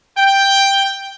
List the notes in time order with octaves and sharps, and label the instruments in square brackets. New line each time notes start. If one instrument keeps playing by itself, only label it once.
[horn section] G5